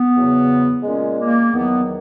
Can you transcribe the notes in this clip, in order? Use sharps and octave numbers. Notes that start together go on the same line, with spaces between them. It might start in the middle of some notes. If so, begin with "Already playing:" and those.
Already playing: B3
E2 C#3 F#3
A#2 G#3 C#4
A#3
E2 D#3 F#3 B3